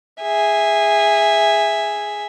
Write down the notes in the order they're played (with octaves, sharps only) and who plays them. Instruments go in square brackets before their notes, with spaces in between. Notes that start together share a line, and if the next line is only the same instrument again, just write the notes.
[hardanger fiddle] G#4 E5